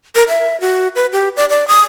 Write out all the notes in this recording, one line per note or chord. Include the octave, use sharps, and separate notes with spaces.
A#4
E5
F#4
B4
G4
D5
D5
D#6